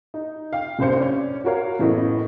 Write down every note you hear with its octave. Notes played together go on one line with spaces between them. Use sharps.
D#4
F5 G5
F#1 C2 G2 C5 C#7
C#4 D5
F4 F#4 A#4 C#5 F5
F#1 A2 E3 B3 D#5